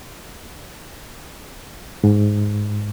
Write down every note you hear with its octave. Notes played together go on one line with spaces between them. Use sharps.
G#2